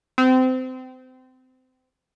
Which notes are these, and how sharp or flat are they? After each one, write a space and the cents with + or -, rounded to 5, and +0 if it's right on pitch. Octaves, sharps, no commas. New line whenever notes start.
C4 -25